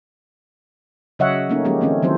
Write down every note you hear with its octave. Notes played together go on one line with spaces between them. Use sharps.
C#3 F#3 C#5 D#5 E5 F#5
A3 A#3 C#4 D#4
F3 G#3 A#3 C#4 G4
D#3 A3 C4 C#4
D#3 E3 F#3 C4 A4 C5